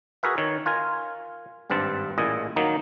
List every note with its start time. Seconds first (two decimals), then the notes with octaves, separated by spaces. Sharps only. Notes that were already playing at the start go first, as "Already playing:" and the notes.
0.23 F#4 G#4 A#4 B4 E5
0.38 D#3 C#5
0.66 F4 A#4 G#5
1.70 G#1 G2 C4 B4 A5
2.18 A1 A#2 E4 G#4 D#5
2.56 D#3 F#3 A#3 D#4